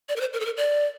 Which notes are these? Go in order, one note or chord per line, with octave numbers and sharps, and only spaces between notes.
D5
A#4
C5
A#4
A4
A#4
D5